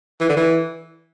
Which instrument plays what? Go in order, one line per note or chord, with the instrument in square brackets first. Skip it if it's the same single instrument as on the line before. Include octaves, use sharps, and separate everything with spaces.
[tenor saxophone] E3
D3
E3